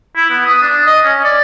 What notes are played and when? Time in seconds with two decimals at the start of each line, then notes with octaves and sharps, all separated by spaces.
0.15 E4
0.30 B3
0.45 D#6
0.61 D4
0.86 D#5
1.05 C#4
1.24 D5